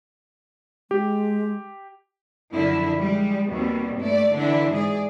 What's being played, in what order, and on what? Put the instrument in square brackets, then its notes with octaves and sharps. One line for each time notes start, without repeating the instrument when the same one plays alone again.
[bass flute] G#3 [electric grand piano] G4
[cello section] F#2 D3 F3 E4
G3 G#3
D#2 B2 G3 C4
G2 A3 D5
D3 E3 D4 E4
G#2 G#4 D5